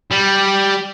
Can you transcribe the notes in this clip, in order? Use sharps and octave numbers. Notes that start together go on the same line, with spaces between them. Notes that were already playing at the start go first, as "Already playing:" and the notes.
G3